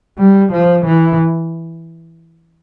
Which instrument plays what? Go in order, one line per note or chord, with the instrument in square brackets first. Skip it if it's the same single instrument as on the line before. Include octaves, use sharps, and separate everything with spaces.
[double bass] G3
F3
E3